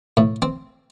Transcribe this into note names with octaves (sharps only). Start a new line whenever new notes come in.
A2
C4